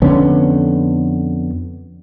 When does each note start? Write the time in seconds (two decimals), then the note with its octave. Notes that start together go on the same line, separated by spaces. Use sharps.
0.02 F2 D3 B3 C#4